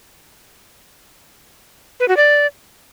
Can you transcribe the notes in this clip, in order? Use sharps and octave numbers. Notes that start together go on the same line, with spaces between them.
B4
F#4
D5